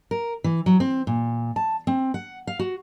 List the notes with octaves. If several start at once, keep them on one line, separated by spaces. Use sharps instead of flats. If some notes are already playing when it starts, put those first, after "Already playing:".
A#4
E3
F#3
C4
A#2
A5
C4
F#5
F5
F#4